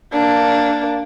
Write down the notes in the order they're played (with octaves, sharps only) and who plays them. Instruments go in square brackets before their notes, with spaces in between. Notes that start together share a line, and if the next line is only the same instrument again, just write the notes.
[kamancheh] A#3 D4